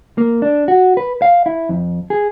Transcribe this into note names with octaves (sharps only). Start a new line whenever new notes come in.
A#3
D4
F#4
B4
F5
E4
F2
G#4